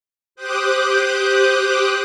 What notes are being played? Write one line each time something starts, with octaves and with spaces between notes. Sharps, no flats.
G4 C5 G5 D6 D#6 F#6